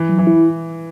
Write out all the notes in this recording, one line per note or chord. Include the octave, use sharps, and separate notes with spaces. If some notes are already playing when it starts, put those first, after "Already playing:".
Already playing: E3
F#3
E3
E4